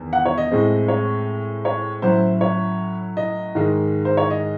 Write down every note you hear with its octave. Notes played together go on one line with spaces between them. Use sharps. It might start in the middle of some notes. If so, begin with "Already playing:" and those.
Already playing: E2 D#3
F#5
C#5
D#5
A2 G#3 C4
C#5
C#5
A2 F#3 C#4 E4 C5
C#5
D#5
G#2 D#3 G#3
C5
C#5
D#5